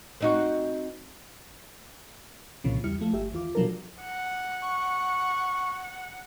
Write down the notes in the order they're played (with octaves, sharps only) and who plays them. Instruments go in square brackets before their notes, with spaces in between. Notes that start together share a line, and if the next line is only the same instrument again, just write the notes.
[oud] C4 D#4 F#4
[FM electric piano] C2 A#2 C#3 E3 F3
E2 G3 E4 F6 C#7
F3 A3
G1 G4 E5
D#2 E3 F4 D6
B2 F3 F#3 D4 A4 A#4
[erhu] F#5
[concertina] C#6